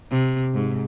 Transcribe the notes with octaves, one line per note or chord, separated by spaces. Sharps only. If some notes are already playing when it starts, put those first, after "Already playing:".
C3
G#2